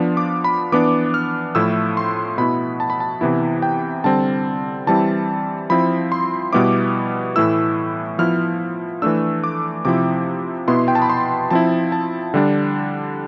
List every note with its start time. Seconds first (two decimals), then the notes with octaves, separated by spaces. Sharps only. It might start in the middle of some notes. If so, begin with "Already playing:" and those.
Already playing: F3 B3 D4
0.17 D6
0.44 B5
0.72 E3 B3 D4 D6
1.14 F6
1.55 A2 F3 A3 E4 E6
1.97 C6
2.38 B2 B3 E4 B5
2.80 A5
2.90 B5
3.00 A5
3.21 C3 E3 B3 E4
3.62 G5
4.04 D3 G3 C4 A5
4.87 E3 G3 C4 E4 A5
5.70 F3 C4 E4 B5
6.12 C6
6.53 B2 G3 B3 E4 D6
7.36 A2 E3 A3 E4 E6
8.19 F3 B3 E4 F6
9.02 E3 A3 D4 E6
9.44 D6
9.85 C3 F3 C4 E4 D6
10.68 B2 B3 E4 C6
10.88 G5
10.95 A5
11.02 B5
11.10 C6
11.51 F3 C4 E4 A5
11.92 A5
12.34 D3 G3 D4